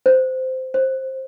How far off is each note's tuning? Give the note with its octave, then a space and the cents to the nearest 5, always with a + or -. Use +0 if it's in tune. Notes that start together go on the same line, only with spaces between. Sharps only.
C5 -15
C5 +15